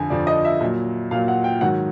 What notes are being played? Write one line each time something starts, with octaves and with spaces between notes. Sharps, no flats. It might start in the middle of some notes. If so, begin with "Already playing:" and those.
Already playing: F2 D3 F3 G#5
F2 D3 F3 D5
D#5
E5
A#2 F#3
A#2 F#3 F5
F#5
G5
G#2 D#3 F#3 F#5